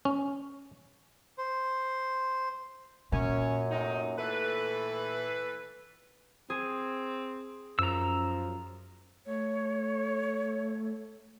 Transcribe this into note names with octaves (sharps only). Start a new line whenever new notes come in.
C#4
C5
F#2 A#2 C#4
C3 A3 D#4
E3 A3 A4 B4
C4 G#4
F#2 F3 A#5 E6
A3 C#5